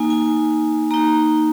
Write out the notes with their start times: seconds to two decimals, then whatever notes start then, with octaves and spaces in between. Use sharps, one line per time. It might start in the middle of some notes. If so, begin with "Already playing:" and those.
Already playing: A#3 D#4 G#5
0.10 G#5
0.91 A#3 D#4 A#5